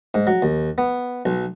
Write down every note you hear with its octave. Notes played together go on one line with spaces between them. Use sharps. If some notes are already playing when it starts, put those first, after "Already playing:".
G#2
F#3
D#2
B3
B1